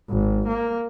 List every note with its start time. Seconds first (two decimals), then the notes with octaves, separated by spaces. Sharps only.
0.11 G#1
0.48 A#3